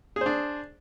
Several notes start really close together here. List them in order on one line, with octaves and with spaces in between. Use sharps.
G#4 C5 D4